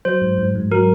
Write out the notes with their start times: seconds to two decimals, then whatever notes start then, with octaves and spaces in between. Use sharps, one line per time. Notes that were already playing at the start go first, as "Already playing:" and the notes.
0.05 F#3 C5
0.22 G#2
0.38 G#2
0.55 G#2
0.71 F#3 A#4